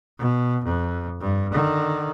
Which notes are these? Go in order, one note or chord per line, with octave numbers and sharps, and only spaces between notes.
B2
F2
G2
D3 D#3